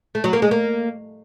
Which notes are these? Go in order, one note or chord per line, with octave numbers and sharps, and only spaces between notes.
A3
F#3
A#3
G#3
A#3